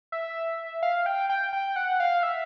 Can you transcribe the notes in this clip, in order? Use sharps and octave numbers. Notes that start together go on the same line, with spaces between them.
E5
F5
G5
G5
G5
F#5
F5
E5